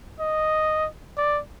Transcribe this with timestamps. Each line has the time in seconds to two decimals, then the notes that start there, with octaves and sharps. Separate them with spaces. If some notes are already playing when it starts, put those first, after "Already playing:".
0.20 D#5
1.17 D5